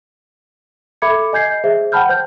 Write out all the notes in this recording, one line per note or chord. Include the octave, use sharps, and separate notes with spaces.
A4 E5 B5 D6 G#6 C#7
D#5 G#5 G6 G#6 C7
G#4 C5 E5
F#5 G5 A5 B5 F6 G6
C5 F6 G6